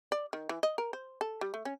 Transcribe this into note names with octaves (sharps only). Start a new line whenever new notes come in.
D5
D#3
E3
D#5
A#4
C5
A4
G3
A3
C#4